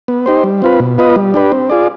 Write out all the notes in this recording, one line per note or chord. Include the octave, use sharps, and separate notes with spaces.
B3
D#4 G4 C5
G3
C4 F4 B4
B2
B3 F4 B4 D#5
G3
D4 G4 B4
C4
F4 G#4 D5